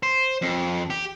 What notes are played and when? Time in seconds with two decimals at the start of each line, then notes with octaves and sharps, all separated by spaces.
0.03 C5
0.42 F2
0.90 G4